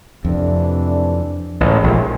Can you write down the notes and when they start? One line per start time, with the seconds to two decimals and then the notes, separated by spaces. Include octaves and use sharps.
0.24 F2 C3 E3 A3 D4
1.60 A1 F2 A2 C3 D#3 G#3
1.84 A#1 A#2